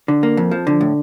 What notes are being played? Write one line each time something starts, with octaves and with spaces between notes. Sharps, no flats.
D3
A#3
F2
F3
D3
A2